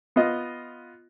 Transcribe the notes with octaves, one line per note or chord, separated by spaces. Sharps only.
B3 F4 D#5